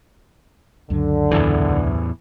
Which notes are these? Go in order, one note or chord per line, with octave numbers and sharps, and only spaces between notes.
C#2 F#2 D3 F#3
E2 A2 E3